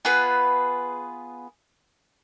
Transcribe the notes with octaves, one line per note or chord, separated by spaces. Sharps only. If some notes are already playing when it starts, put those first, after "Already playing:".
B3 F4 G#4 B4